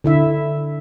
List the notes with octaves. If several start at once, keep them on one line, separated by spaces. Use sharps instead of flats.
D3 E4 E5